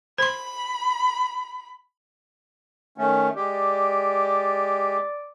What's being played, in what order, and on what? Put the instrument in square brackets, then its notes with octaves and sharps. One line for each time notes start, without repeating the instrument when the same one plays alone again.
[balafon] C5 C6 [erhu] B5
[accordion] D#3 A3 C#4
[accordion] G#3 G4 [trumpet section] D5